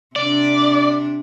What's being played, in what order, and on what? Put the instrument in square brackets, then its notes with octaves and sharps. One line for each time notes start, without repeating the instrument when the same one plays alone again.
[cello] C3 D4 [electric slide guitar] D5